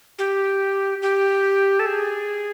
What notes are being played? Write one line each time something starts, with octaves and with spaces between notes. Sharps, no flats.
G4
G4
A4
G#4